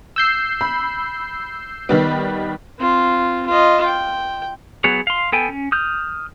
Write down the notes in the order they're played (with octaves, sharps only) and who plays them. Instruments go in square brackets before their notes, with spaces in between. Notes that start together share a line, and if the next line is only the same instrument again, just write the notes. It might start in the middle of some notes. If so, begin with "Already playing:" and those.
[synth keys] E6 G6 C7
[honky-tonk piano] B5
D#3 G3 B3
[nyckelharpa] C4 F4
F4 D#5
G5
[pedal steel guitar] F#3 B3 G#4 C#5
F5 C6
B3 A4 G5 G#5
C#4
D#6 F6 G6